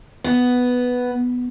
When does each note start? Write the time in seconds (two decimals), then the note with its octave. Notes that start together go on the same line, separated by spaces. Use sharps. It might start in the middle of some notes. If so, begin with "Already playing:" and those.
0.24 B3